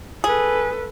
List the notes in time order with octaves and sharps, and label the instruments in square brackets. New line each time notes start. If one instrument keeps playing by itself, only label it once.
[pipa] G#4 [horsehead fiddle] A4 B4